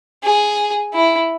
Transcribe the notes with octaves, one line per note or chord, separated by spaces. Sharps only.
G#4
E4